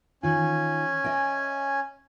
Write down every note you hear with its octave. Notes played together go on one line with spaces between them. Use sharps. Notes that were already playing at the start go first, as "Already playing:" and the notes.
D#3 C#4 F4 G#5
D#5 E5 G5